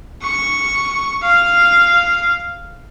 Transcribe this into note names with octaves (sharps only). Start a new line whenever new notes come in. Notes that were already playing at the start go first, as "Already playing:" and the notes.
C#6
F5